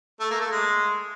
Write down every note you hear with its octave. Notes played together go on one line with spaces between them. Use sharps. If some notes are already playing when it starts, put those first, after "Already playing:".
A3
A#3
A3
G#3